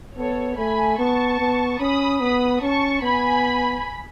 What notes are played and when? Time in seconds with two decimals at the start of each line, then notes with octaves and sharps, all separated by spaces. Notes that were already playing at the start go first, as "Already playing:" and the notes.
0.16 B3 A4 C#5
0.57 A3 G#5 B5
0.98 B3 A5 C#6
1.40 B3
1.80 C#4 B5 D#6
2.20 B3 B5 D#6
2.62 C#4 A5 C#6
3.02 B3 G#5 B5